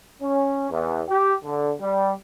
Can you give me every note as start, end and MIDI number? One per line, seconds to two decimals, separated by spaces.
0.22 0.67 61
0.70 1.01 40
1.09 1.32 67
1.44 1.72 50
1.81 2.13 55